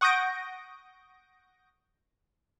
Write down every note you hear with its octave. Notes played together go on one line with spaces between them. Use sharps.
F#5 C#6 D#6 G6 A#6 D7